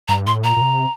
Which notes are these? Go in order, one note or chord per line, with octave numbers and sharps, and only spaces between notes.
G2 A#5
A2 C6
A#2 A#5
A#2
C3